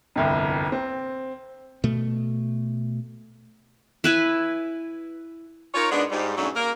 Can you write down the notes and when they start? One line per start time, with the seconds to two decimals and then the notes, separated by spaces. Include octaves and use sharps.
0.16 G1 C2 F2
0.72 C4
1.84 B2 A3
4.04 E4 B4 G#5
5.74 D#4 F4 A#4 C#5
5.91 G#2 G#3 B3 D4
6.10 G#2 G3
6.37 G#2 B2 F#3 A3 C#4 D4
6.55 A#3 A#4